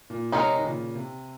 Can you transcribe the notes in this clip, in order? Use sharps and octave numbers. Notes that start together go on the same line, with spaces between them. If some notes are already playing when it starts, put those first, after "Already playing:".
A#2
C3 G#3 D#4 A#4 C#5
D#3
A#2 C#3
C3